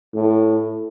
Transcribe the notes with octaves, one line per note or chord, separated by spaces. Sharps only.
A2